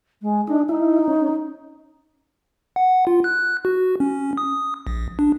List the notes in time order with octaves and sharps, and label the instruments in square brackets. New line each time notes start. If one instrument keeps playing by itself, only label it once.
[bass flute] G#3
[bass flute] D4 [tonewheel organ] D#4
[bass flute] D#4 [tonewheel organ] E4
[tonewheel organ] C#4
[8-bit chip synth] F#5
F4
F#6
F#4
C#4
D#6
A#1
D4